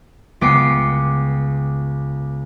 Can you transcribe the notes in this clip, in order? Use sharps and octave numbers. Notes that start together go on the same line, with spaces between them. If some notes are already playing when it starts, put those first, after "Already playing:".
C#2 B3 G5 D6 C7 C#7